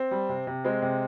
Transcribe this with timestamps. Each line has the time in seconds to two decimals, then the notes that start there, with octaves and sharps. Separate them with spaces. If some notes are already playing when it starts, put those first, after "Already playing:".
Already playing: C4
0.11 G3
0.29 C3
0.47 C3
0.64 G#3 C4
0.82 C3